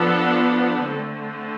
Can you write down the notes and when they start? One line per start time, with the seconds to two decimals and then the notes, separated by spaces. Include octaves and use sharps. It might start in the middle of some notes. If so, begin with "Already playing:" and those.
Already playing: F3 B3 D4 A4
0.91 D3 A3 C4